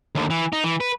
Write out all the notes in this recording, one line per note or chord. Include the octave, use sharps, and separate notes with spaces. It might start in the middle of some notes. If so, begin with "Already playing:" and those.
D#2 D3
E3
D#4
E3
B4